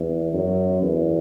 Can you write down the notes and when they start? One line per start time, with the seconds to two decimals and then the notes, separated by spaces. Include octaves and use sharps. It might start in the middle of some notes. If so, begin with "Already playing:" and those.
Already playing: E2
0.33 F#2
0.82 E2